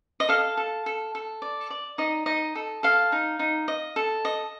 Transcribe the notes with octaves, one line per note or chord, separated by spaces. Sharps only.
D#5
A4 F5
A4
A4
A4
D5
D5
D#4 D#5
D#4 D#5
A4
A4 F5
D#4
D#4
D#5
A4
D#5